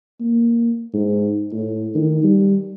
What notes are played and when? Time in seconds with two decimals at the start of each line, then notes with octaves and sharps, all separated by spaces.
0.21 A#3
0.94 G#2
1.52 A2
1.95 D#3
2.24 G3